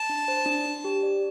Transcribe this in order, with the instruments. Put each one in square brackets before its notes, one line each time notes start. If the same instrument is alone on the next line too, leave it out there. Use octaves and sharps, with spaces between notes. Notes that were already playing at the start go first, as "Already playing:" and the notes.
Already playing: [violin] A5
[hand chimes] D4
C5
D4
D4
G4
D5